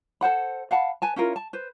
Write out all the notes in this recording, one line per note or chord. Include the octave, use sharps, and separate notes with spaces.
A4 C5 F#5 B5
F5 F#5 A5 B5
B4 G#5 A5
C#4 E4 F4 A#4
A5
B4 C5